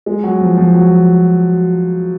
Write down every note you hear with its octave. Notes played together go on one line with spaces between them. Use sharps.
G#3
F#3
F3
F3
F#3